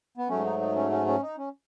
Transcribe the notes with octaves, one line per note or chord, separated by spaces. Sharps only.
B3
G#2 F#3 A3 C#4
D#4
D#4
C#4
C#4
C#4
D#4
C#4